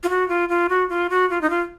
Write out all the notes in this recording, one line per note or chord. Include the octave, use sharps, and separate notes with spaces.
F4
F#4
F4
F4
F#4
F4
F#4
F4
D#4
F4